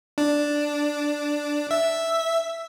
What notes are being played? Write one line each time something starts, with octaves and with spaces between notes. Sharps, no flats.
D4
E5